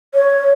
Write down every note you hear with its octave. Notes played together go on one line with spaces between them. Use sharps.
C#5